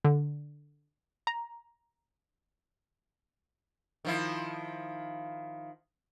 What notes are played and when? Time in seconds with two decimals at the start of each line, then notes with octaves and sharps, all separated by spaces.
0.04 D3
1.27 A#5
4.05 D#3 F3 E4